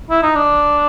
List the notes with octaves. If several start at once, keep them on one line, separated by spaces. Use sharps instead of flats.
E4
D#4
D4